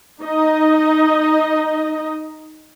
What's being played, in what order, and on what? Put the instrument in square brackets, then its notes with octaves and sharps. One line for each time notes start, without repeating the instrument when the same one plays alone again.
[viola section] D#4 D#5